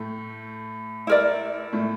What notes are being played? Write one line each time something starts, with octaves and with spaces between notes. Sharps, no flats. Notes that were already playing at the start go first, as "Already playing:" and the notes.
Already playing: A2 A3
E4 A#4 D5
A2 A3